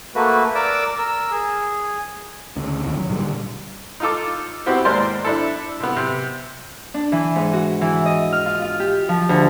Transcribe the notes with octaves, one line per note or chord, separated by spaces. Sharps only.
A3 A#3 F#4 B4
A#4 D5 D6 E6
A#4 E6
G#4
D2 C#3
F1 D2 D#3
F#3
A#2 D3 D#3 G3
D#4 F4 A4 D6
B3 C4 E4 F#4 G4 C5
D#2 G#2 A#4 C5 D5 C6
D4 E4 A4
C3 B3
C3
D4
E3
G#2
F#4
E3
D#5
F6
F4
F4
G4
F3
D2